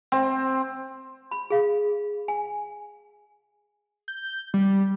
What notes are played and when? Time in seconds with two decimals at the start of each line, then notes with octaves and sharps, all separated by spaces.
0.12 C4
1.31 B5
1.50 G#4 F5
2.28 G#5
4.08 G6
4.54 G3